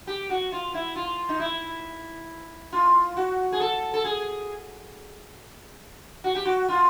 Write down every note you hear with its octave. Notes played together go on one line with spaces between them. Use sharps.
G4
F#4
F4
E4
F4
D#4
E4
F4
F#4
G#4
A4
A4
G#4
F#4
G4
F#4
F4